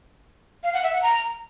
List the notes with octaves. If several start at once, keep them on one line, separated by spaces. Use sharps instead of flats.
F5
F#5
E5
F#5
A#5